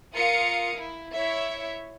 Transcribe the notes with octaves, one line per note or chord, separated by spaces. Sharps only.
F4 A#4 F5 D#6 C#7
E4
E4 C#5 E5